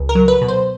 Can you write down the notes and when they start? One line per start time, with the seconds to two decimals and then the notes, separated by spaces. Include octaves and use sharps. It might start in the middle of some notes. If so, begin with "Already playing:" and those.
Already playing: C#2
0.09 A#4
0.15 F#3
0.28 B4
0.42 B2
0.48 C5